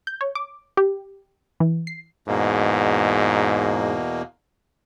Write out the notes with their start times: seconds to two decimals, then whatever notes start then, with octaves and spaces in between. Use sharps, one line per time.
0.07 G6
0.21 C#5
0.35 D6
0.77 G4
1.60 E3
1.87 C7
2.28 E2 G#2 B2 A#3